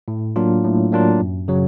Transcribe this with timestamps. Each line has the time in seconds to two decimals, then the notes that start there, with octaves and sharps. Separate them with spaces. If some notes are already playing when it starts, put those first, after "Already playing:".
0.08 A2
0.36 F#3 A#3 D4 F4
0.64 A2
0.92 F#3 A#3 D4 F4
1.20 F#2
1.48 C#3 F#3